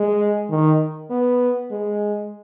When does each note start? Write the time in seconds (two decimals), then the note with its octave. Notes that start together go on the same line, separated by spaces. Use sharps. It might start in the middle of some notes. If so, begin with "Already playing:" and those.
Already playing: G#3
0.50 D#3
1.10 B3
1.71 G#3